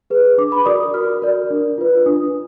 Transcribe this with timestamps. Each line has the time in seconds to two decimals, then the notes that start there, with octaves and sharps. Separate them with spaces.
0.10 G#4 B4
0.38 D4 D6
0.52 B5
0.66 F#4 A#4 D5 D#6
0.94 F#4 F6
1.22 A#4 D5
1.50 D4
1.78 F4 B4
2.06 D4 D#6